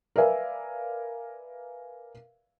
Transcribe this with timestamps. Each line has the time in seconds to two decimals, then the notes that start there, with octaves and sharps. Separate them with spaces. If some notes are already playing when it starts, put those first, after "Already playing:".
0.16 A#4 B4 D5 E5 F5 G#5